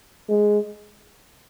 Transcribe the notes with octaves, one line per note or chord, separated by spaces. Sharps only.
G#3